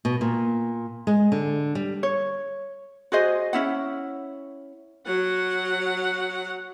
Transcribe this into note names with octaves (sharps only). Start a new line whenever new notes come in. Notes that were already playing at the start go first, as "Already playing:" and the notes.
B2
A#2
G#3
D3
G3
C#5
F#4 G#4 C5 D#5
C#4 E4 F#5
F#3 F#5